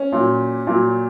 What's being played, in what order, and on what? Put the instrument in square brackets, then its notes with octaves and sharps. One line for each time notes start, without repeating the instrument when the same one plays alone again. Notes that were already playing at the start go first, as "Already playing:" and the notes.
Already playing: [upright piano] C#4
A#2 F#3
A#2 F#3